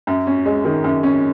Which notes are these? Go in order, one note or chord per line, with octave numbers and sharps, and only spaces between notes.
F#2
C#4
G#3
D#3
F#2
C#4